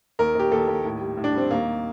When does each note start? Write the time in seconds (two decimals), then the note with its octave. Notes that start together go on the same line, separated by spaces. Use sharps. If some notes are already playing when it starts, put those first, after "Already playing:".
0.19 D#2 A#4
0.35 D#2 G4
0.52 D#2 A4
0.68 D#2
0.85 A2
1.01 G3
1.17 A2
1.24 D4
1.35 G3 C4
1.51 D#2 A#3